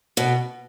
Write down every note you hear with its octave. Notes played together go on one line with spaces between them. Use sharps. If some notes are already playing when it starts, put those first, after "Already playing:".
B2